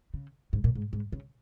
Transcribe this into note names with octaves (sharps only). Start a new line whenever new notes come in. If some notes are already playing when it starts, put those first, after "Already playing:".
C#3
G#2
A#2
G#2
G#2
C#3